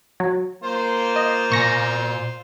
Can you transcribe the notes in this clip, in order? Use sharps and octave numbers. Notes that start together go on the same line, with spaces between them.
F#3
A#3 F4 C5
D#5
A#2 G#5 C#6 A#6